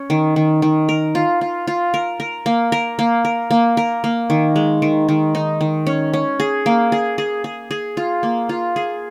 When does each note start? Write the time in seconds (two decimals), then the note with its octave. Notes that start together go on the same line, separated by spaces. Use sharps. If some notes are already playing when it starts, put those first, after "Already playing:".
Already playing: C#4
0.10 D#3
0.36 D#3
0.62 D#3
0.89 A#4
1.15 F4
1.41 F4
1.67 F4
1.94 A#4
2.20 A#4
2.46 A#3
2.72 A#4
2.99 A#3
3.25 A#4
3.51 A#3
3.77 A#4
4.04 A#3
4.30 D#3
4.56 G#3
4.82 D#3
5.09 D#3
5.35 D#4
5.61 D#3
5.87 C#4
6.13 C#4
6.40 G#4
6.66 A#3
6.92 G#4
7.18 G#4
7.44 G#4
7.71 G#4
7.97 F4
8.23 A#3
8.49 F4
8.76 G#4